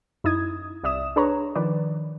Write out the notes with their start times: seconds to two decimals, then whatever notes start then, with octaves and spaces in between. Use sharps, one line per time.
0.24 F#2 D#4 E4 D#6 G#6
0.83 C2 D5 E5 D#6 E7
1.16 D4 G#4 B4 C#5 A#5
1.56 D#3 F3 B4 D5